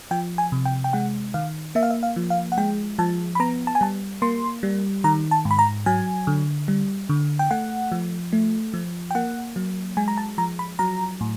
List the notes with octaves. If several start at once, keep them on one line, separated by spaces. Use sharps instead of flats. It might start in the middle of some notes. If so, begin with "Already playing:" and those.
F3 G5
G#5
C3
G5
G5
G#3 F#5
D#3 F5
A#3 E5
F5
E5
F5
F3
F5
F#5
G#3 G5
F3 A5
B5
B3 A#5
A5
G#5
G3 A5
A#3 C6
G3
D#3 A#5
A5
G#2
B5
A#5
F#3 G#5
D3
G3
D3
G5
A3 F#5
F3
A3
F3
G5
A#3 F#5
F#3
G#3 G#5
A#5
A5
F3 A#5
B5
F#3 A#5
A2